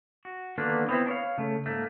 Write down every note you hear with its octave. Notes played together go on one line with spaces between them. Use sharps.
F#4
D3 D#3 A#3 B3 D4
B3 C4 E4
D4 C#5 F5
C#3 A3
G#2 A3 A#3